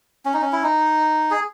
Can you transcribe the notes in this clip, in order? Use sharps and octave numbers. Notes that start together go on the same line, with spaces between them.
C#4
D#4
C#4
E4
D#4
G#4